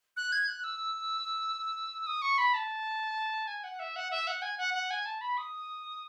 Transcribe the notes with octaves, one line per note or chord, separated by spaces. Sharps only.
F#6
G#6
F#6
E6
D#6
C#6
B5
A5
G#5
F#5
E5
F#5
E5
F#5
G#5
F#5
F#5
G#5
A5
B5
D#6